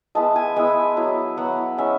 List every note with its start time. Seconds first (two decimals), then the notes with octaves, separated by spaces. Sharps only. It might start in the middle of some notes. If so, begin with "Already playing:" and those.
0.15 G#3 B3 E4 A5
0.36 G#5
0.56 G#3 B3 E4
0.97 F#3 B3 E4
1.37 F#3 B3 E4 F#5
1.78 G#3 C#4 E4 E5